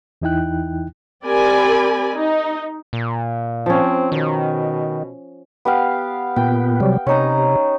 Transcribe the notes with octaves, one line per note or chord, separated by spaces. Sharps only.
E2 E3 D#4 E4 G5 F#6
C4 G4 A#4 D5 G#5 B5
D#4
A#2
F3 C4 C#4
B2 D#3
B3 G4 F5
A#2 B3 G5
C3 F#3 G3
C3 C#4 D#4 A#5